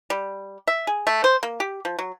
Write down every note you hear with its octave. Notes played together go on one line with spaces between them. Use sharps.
G3
E5
G#4
A3
C5
A#3
G4
F3
F#3